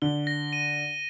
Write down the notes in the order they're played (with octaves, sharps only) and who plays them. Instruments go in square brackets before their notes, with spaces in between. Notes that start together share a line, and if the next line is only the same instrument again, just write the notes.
[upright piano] D3 [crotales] G7
[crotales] A#6
D#7